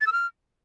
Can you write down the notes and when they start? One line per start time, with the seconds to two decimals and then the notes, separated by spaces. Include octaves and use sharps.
0.01 A6
0.07 E6
0.12 F6